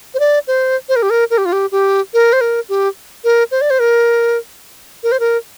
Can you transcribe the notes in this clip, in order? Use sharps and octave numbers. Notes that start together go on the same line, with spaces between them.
C5
D5
C5
C5
A#4
G4
A#4
A#4
G4
F4
G4
G4
A#4
C5
A#4
G4
A#4
C5
D5
C5
A#4
A#4
C5
A#4